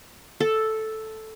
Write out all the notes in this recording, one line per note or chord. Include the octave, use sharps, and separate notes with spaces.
A4